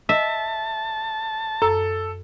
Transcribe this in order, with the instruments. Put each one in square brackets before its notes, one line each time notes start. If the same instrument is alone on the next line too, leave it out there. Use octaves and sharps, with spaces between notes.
[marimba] D#5 [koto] E5 [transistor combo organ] A5
[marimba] F#2 E6 [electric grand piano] A4